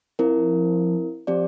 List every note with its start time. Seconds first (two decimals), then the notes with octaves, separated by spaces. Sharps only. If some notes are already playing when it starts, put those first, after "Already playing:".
0.19 F3 C4 E4 A#4
1.27 F3 C4 G4 D5